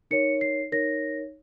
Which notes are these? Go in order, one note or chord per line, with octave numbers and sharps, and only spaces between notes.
D#4 A#4 C#5 C#7
C7
D#4 A#4 C#5 A#6